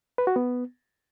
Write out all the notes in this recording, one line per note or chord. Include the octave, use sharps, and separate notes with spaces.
B4
F#4
B3